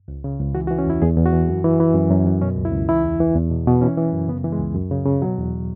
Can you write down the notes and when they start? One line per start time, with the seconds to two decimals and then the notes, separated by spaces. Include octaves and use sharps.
0.08 C#2
0.24 C#3
0.40 C#2
0.55 E3 F#4
0.67 F#4
0.71 E3
0.78 C#4
0.86 E2 E4
1.02 E2 G#4
1.17 E2
1.26 F#4
1.33 E3
1.49 F#2
1.64 E3
1.80 E3
1.95 F#2
2.10 F#2
2.26 F#2
2.42 B2 C#4
2.57 C#2
2.65 E4
2.72 C#2
2.89 E3 E4
3.04 E2
3.20 E3
3.35 E2
3.50 B2
3.67 B2
3.81 E3 C#4
3.98 E3
4.13 F#2
4.28 C#3 B3
4.44 E3
4.52 G#3
4.60 C#2
4.75 F#2
4.91 C#3
5.06 C#3
5.22 B2 F#3
5.38 E2